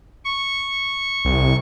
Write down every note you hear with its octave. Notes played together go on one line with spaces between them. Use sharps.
C#6
C2